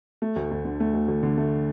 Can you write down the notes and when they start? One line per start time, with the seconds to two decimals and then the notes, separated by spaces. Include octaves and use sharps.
0.22 A3
0.36 D2
0.51 D2
0.65 D3
0.80 A3
0.93 D2
1.08 D2
1.23 D3
1.37 A3